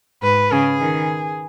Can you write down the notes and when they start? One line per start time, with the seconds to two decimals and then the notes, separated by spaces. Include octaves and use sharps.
0.22 G#2 B4
0.52 C#3 G#4
0.81 D#3